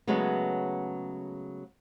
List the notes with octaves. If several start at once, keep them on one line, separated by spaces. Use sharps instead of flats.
C#3 F#3 G#3 A3 B3